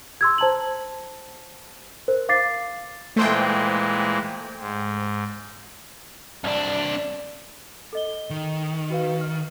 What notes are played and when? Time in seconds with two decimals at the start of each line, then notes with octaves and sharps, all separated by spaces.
0.21 C6 E6 G#6
0.38 C5 A5 A#5 F#7
2.08 A#4 C5
2.29 F5 D6 A6 C7
3.16 A#2 E3 G#3 A3 C5 G5
4.59 G#2
6.44 C2 D4
7.93 A4 D#5 G7
8.30 D#3
8.90 F#4 B4 F5
9.21 F6